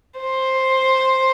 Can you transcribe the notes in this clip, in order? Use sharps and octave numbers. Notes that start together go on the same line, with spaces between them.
C5